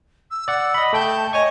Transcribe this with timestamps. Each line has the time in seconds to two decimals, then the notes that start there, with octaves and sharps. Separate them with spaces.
0.31 E6
0.48 D5 F#5
0.74 D#5 B5
0.93 A3 G5 A5 G6
1.33 C#5 D#5 G#5 C#6